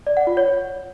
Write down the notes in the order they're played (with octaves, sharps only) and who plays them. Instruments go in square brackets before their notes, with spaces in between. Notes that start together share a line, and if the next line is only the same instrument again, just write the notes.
[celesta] D5
F#5
F4
C#5